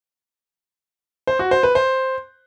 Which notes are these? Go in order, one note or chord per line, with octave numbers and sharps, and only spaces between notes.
C5
F#4
C5
B4
C5